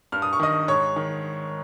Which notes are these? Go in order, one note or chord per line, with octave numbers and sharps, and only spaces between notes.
G2 F6
D#6
C#6
D#3 D#5 D#6
G#2 C#5 C#6
D#3